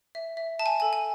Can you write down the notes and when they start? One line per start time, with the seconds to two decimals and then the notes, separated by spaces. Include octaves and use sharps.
0.15 E5
0.37 E5
0.59 E5 A5
0.66 G#5
0.80 A4 G#5
0.93 G#5